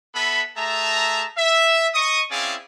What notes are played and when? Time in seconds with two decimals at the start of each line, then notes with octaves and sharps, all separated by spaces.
0.15 B3 A4 B4 E5 B5
0.57 A3 G#4 E5 A5 A#5
1.37 E5
1.95 D#5 C#6 D#6
2.31 C4 C#4 E4 G#4 D5 F5